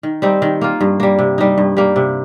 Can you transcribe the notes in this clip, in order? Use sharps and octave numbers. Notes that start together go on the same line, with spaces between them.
D#3
G3 C4 D#4
D#3
A#3 F4
G2
G3 A#3
C3
G3 D#4
G2
G3 A#3
C3